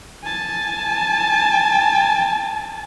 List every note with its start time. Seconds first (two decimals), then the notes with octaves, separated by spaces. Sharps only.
0.24 G#5 A5